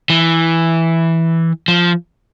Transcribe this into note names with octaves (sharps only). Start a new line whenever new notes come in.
E3
F3